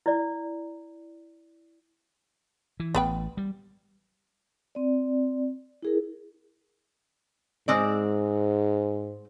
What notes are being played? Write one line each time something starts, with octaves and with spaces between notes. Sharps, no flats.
E4 D5
E3
A1 B3 B4 G5
G3
C4 D5
E4 G#4 A#4
G#2 G#3 C4 D5